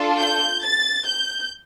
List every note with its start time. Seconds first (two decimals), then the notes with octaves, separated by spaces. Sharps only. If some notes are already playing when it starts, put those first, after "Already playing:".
Already playing: D4 F4 A4
0.20 G6
0.63 A6
1.06 G6